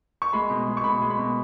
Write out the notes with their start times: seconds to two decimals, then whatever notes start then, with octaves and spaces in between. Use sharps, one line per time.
0.22 C#6
0.33 G#3 B5
0.50 B2
0.67 G#3
0.77 C#6
0.84 B2 B5
1.02 G#3
1.10 B5
1.18 B2